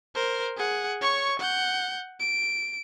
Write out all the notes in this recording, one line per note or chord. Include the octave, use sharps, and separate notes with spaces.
A#4 C5
G#4 F#5
C#5 C#6
F#5 G6
D7